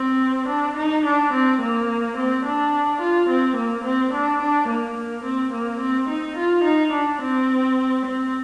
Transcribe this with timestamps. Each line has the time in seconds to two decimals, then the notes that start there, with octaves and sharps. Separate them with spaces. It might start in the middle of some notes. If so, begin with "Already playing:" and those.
Already playing: C4
0.49 D4
0.77 D#4
1.06 D4
1.34 C4
1.62 A#3
2.17 C4
2.45 D4
3.01 F4
3.29 C4
3.56 A#3
3.85 C4
4.13 D4
4.41 D4
4.69 A#3
4.98 A#3
5.25 C4
5.53 A#3
5.81 C4
6.09 D#4
6.37 F4
6.65 D#4
6.93 D4
7.22 C4
8.06 C4